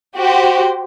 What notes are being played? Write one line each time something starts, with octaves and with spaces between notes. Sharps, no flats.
F#4 G4 C5